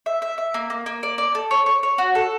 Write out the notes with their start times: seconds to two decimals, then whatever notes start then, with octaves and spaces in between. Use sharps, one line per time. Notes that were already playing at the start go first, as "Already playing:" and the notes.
0.06 E5
0.22 E5
0.38 E5
0.54 A#3
0.70 A#3
0.86 A#3
1.03 D5
1.18 D5
1.35 A4
1.51 C#5
1.66 C#5
1.83 C#5
1.98 F#4
2.15 A4